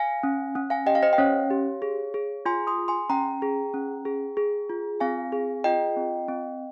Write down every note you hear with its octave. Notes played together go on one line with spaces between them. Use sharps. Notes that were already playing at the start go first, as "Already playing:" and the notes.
Already playing: F5 G#5
C#4
C#4
F5 G#5
G4 D#5 G5
F5
C5 D#5
G5
C#4 C#5 F5
G4
G#4
G#4
F4 G#5 C6
C6 D#6
G#4
G#5 C6
C#4 G5 A#5
G#4
C#4
G#4
G#4
F4
C4 F5 G#5
G#4
F4 D#5 G5
C4
C4